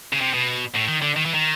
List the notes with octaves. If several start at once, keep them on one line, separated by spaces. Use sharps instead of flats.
C#3
C3
B2
A2
D#3
D3
D#3
E3
D#3